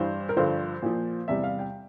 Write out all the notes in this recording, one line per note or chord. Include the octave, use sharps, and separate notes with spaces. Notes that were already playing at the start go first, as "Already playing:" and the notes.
Already playing: G2 E3 G3 C5
A#4
G2 D3 F3 C5
A#2 F3
E2 C3 G3 E5
F5
G5